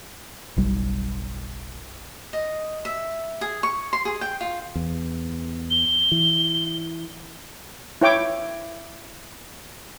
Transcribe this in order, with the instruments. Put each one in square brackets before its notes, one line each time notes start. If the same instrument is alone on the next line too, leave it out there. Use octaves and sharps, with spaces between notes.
[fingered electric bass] F#1 B1 G3
[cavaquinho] D#5
E5
G#4
C#6
C6
G#4
G5
F4
[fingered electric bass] E2
[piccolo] G7
[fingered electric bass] E3
[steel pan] E4 C#5 G5 D6